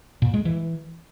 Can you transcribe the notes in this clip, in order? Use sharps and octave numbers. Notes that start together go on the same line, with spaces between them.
A#2
G#3
E3